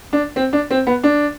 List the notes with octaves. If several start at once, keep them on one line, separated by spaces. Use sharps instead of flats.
D4
C4
D4
C4
B3
D4